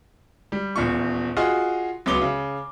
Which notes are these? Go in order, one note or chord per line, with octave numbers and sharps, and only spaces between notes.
G3
D#1 E2 F4 C#6
F4 F#4 G#4 D#5
C#2 F#3 B3 D6 G7
C#3